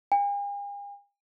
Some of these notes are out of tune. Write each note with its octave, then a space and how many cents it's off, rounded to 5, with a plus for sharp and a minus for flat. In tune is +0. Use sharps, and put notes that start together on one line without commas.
G#5 -45